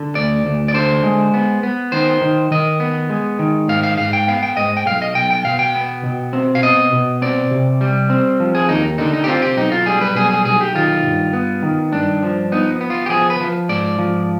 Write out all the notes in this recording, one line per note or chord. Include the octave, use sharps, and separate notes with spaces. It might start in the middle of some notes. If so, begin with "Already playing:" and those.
Already playing: D3
D2 D5
D2
D5
D3 C5
G#3
B3
B3
D#3 C5
D#3
D#3 D#5
B3
G#3
D#3
G#2 F5
F5
G#2 F5
G5
B3 F5
G5
G#2 D#5
G5
B1 F5
D#5
B1 G5
G5
B2 F5
G5
B3
B2
C4
F5
B2 D#5
B2
C4 D5
C3
G3
C4
F3
G#4
D#2 D#4
D3 D#4
D#4
G4
C4 F4
G4
B1 D#4
F4
G3 G#4
B4
B1 G#4
G#4
B1 G#4
G4
D#3 F4
G2
B3
D#3
G2 D4
F3
B3 D#4
B3
F4
G4
F3 G#4
B4
F3
G#2 D5
F3